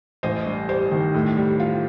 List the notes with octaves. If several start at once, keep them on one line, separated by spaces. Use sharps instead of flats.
A1 C5 D#5
G2
G3 C5
D#3
A2
G3
F4